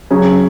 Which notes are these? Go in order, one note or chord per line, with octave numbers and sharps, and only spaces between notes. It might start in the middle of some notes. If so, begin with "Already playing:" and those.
C#3 F#3 C#4 G#4